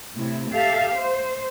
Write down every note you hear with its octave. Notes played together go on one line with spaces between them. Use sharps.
A2 C3 E4
G4 A4 E5 F5
C5